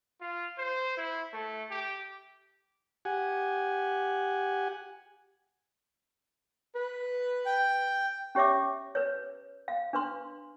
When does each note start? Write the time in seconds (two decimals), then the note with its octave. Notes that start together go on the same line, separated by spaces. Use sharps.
0.21 F4
0.58 C5
0.97 E4
1.33 A3
1.70 G4
3.05 G4 F#5 G#5
6.75 B4
7.46 G5
8.35 C#4 G4 C#5 E5 D6
8.95 B4 C#5
9.68 F5
9.93 D4 B4 C6